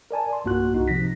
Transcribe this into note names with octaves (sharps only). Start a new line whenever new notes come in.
A#4 D5 G#5 A5
C6
B1 G2 A#3 F4 F#4 F#6
C2 D#4 F#4
C3 F3 A#6 B6